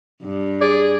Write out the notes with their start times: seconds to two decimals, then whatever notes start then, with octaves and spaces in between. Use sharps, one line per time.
0.23 G2
0.61 G#4 D5